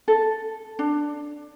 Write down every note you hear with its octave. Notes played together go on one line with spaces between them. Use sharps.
A4
D4